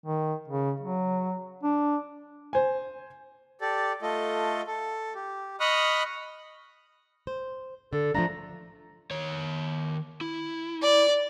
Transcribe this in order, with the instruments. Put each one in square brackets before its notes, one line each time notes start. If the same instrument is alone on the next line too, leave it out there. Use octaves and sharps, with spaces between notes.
[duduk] D#3
C#3
F#3
D4
[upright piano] C5 G#5
[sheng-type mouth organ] G4 A4 D5
A3 F4 A4 D#5
A4
G4
D#5 B5 C#6 D#6 F6 F#6
[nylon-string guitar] C5
[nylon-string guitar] D3 [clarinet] A4
[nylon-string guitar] F3 A3 D4 [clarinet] A#5
[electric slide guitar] D#3 C#5
E4
[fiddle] D5